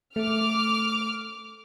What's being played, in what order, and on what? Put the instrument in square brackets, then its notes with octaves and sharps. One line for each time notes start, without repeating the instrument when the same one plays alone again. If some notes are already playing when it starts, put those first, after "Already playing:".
[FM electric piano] A3 [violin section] D6 F6